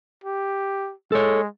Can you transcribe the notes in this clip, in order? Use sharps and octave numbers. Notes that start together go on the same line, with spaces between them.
G4
G#3 A4 C#5